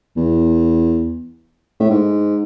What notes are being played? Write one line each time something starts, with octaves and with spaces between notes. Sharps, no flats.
E2
A2
G#2